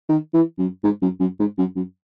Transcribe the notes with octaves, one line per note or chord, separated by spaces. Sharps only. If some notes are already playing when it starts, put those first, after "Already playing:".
D#3
E3
F#2
G#2
F#2
F#2
G#2
F#2
F#2